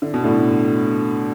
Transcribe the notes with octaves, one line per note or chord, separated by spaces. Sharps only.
D3
B2
A2 D3